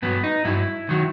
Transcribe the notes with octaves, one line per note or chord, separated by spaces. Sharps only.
G2 F#3 B3
D#4
G2 F#3 E4
D#3 F#3